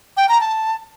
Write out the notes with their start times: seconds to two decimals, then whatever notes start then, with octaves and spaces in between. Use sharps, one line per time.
0.17 G5
0.29 A#5
0.41 A5